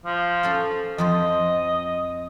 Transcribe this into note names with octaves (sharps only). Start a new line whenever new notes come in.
F3
C#4 A4 F5
F2 F3 C5 D#5